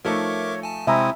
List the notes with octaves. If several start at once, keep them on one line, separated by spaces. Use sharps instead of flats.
F3 A3 D#4 A#4 C#5 E5 D6
G#5 A5
C3 G#3 C4 E4 E5 G#5 A#5 D#6